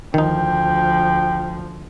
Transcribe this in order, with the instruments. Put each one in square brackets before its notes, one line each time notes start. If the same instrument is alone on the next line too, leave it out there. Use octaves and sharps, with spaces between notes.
[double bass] D2 F3 [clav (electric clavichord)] D#3 D#4 [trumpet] G5